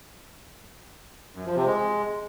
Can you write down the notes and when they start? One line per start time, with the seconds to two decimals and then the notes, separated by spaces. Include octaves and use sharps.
1.35 F#2
1.46 F3
1.56 C3
1.66 G#3